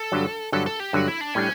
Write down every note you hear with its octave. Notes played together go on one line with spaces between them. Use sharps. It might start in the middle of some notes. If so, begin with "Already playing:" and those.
Already playing: A4
G2 D3 F#3
G2 D3 F#3 A4
A4
G4
G2 D3 F#3 F#4
E4
D4
A2 G3 C#4 D4